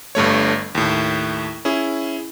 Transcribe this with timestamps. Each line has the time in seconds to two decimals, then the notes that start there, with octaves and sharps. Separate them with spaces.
0.15 G1 G2 A3 C#5
0.75 D#2 A2
1.65 C#4 E4 G#4